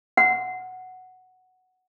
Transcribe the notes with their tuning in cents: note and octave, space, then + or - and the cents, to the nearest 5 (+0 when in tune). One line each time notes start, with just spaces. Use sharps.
F#5 +0